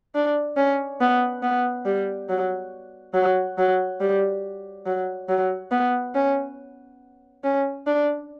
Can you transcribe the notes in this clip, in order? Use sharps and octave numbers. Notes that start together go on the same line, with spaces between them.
D4
C#4
B3
B3
G3
F#3
F#3
F#3
G3
F#3
F#3
B3
C#4
C#4
D4